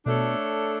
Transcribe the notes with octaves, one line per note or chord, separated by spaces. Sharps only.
B2 A3 D4 A4 C#5